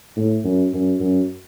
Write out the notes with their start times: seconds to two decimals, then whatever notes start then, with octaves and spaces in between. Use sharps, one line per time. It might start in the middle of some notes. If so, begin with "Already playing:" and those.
0.16 A2
0.44 F#2
0.73 F#2
1.00 F#2